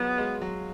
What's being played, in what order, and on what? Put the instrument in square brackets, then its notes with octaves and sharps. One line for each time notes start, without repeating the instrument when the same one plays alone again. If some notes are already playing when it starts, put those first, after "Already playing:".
Already playing: [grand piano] F#3 G#3 F4 F#4 [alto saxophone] B3
[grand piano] G#3
F#3